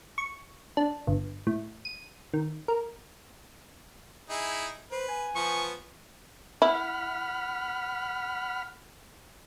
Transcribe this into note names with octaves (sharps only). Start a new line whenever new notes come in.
C#6
D4
G1
A2
D#7
D#3
A#4
D#4 E4 G#4
B4 C5
G#5
F3 B3 C#6
E4 F#5 B5 F6